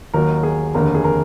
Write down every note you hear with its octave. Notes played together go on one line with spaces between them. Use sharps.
D#2 D#3 F#3 A#4
G#4
F1 D#2 D3 A#4
G#4
A#4